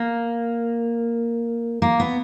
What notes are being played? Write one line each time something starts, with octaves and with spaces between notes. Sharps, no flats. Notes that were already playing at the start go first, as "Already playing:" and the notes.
Already playing: A#3
A#3
B3